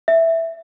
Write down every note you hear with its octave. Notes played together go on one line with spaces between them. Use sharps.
E5